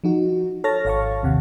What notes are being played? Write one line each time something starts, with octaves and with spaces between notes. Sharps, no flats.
F3 D#4 F#4
A4 C#5 A5 F6 A6 A#6
G#1 C#5 F5 A5 C#6
D#2 C3 F#5